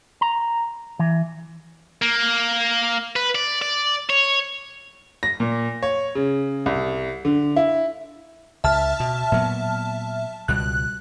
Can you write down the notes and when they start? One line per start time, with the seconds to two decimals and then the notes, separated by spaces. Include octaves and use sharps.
0.21 A#5
0.99 E3
2.02 A#3
3.16 B4
3.35 D5
3.62 D5
4.10 C#5
5.23 A#6
5.40 A#2
5.83 C#5
6.15 C#3
6.66 C2
7.25 D3
7.56 E4
8.64 C#2 E5 A5 F6
9.00 B2
9.32 A#2 F#3 B3
10.48 C#2 B2 G3 F#6